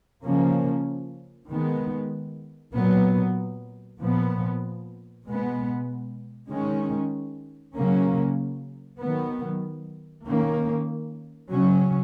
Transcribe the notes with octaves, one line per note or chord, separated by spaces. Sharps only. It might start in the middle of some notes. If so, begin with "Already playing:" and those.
C#3 F3 A#3 C#4
D#3 G#3 B3
A#2 F#3 B3
A#2 F3 B3
B2 G#3 B3
D#3 G#3 C#4
C#3 F#3 A#3 C#4
D#3 F#3 B3
D#3 A#3 C#4
C#3 F#3 C#4